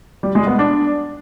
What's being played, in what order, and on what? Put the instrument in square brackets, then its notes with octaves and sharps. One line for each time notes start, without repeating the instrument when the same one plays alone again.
[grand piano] G3
G#3
B3
D4